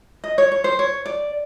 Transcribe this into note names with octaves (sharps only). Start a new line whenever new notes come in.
D#5
C#5
C#5
C5
C#5
D5